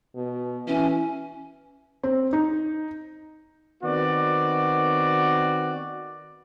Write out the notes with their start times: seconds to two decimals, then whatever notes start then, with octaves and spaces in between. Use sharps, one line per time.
0.16 B2
0.67 E3 C#4
2.03 C4
2.33 D#4
3.83 D#3 B3 C4 F#4 D5